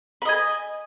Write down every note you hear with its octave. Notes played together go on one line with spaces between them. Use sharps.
D#5 G#5 B5